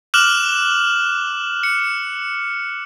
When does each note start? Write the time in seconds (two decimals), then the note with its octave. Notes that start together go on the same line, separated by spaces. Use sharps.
0.14 D6 F6 F#6 E7 F#7
1.63 C#7